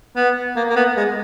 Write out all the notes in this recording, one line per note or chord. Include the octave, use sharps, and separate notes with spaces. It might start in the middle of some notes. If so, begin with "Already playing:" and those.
B3
A#3
A#3
B3
G#3